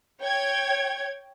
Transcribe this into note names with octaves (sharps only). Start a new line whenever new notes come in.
C#5 G5 G#6